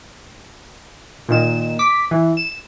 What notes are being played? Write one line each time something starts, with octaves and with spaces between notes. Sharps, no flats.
A#2 D#3 E7
D6 B6
E3
E7